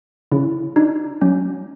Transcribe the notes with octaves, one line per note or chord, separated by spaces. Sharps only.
C#3 E4
D4 D#4
F#3 C#4